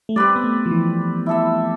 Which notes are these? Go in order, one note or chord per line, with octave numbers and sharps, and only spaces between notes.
A3
G3 C4 G4 B4 D5
B3
A3
F3
E3
E4 A4 E5